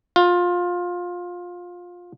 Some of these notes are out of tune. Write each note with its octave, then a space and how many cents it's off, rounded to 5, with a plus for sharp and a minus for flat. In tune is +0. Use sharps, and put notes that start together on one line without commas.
F4 +20